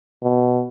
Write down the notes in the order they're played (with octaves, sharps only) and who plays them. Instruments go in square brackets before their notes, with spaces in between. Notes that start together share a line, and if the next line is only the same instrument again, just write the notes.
[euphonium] B2